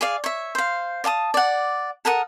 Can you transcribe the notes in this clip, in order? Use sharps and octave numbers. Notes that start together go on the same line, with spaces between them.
G#4 D5 F5
C#5 E5
C5 F5
D5 F5 A5 D#6
D5 F#5
A4 A#4 F#5 D#6